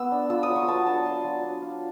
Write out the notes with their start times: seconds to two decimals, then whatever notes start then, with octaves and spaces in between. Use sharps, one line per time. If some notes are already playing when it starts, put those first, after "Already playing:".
Already playing: B3 E6
0.12 D4
0.30 F4 E6
0.43 D#6
0.49 F#3
0.56 C#6
0.68 B3 A5
0.87 D4 A5
1.06 F4 C6
1.24 F#3
1.43 D4
1.62 F4